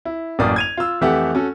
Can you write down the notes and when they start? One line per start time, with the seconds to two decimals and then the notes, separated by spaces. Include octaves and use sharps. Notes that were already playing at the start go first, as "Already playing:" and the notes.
0.05 E4
0.39 A1 F#2 A#3 D5 D#6
0.56 G#6 D#7 F7
0.78 F4 E6
1.01 F2 E3 A3 G4 E5 F#5
1.35 C#4 F#4 A4